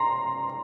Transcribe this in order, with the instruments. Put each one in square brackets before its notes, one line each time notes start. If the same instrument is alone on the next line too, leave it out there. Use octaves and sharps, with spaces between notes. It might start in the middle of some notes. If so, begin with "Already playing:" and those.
Already playing: [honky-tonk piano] A#5 C6